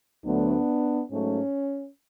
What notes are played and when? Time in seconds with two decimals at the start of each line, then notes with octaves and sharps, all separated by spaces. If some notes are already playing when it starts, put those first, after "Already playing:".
0.25 D2 D3 F#3 A3 B3 D4
1.10 G#2 F#3 A3 C#4